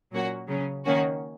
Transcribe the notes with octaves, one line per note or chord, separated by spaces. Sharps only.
A#2 F#3 A#3 C#4 F#4
C#3 F#3 C#4
D#3 A#3 C#4 F#4